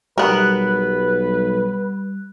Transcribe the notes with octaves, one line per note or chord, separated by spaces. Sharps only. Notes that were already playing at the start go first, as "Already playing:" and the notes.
B1 G3 B3 A#4 B4 F#6